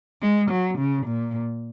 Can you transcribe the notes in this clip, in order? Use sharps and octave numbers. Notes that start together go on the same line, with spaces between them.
G#3
F#3
C#3
A#2